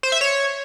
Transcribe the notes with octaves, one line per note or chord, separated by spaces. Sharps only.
C5
E5
C#5